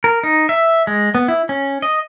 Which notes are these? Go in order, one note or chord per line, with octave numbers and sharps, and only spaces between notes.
A#4
D#4
E5
G#3
B3
E4
C#4
D#5